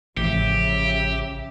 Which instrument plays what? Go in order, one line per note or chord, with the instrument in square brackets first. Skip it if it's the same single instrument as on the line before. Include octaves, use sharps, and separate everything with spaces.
[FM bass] A1 [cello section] C#3 F3 E5 [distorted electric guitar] G4